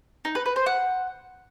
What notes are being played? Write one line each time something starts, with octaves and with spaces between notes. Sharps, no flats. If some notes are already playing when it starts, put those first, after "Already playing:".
D#4
B4
B4
C5
F#5